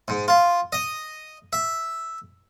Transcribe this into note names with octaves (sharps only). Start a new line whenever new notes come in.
G#2
F4
D#5
E5